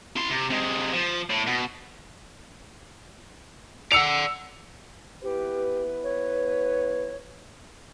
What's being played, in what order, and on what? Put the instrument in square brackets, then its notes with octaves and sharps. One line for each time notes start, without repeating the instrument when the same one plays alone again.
[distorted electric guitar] E4 C6
C3
C3 G#3
F3
A2
B2
[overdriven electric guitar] D5 F#5 [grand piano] E6 C#7 F7
[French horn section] B3 E4 B4 [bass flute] G4
[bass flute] C#5